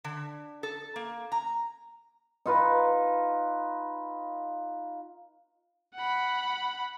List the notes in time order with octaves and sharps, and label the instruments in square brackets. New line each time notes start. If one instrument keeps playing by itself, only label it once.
[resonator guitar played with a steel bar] D3
A4
A#3
A#5
[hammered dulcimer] D#4 F4 B4
[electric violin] F#5 B5